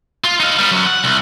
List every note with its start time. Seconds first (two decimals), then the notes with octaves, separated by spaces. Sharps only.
0.24 F4
0.40 D#4 F5
0.58 G3 B3
0.71 F#2 F#3
0.86 F#5
1.04 C2